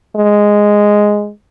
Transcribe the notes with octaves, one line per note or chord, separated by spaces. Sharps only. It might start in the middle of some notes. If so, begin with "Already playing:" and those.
G#3